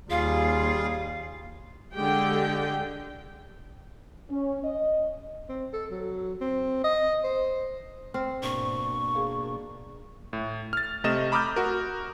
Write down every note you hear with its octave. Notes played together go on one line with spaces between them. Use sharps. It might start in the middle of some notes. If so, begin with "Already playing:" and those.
D#2 G3 F4 G#4 F5
D3 G#3 G4 G5
C#4
D#5
C4
A4
F#3
C4
D#5
C5
C4 F6
G#2 B2 A#3 D4 C#6
G#4 A#4 F5
A2
F6 A6
C3 A3 D#5 E7
A#5 B5 D6 D#6 F6 G6
F#4 A#4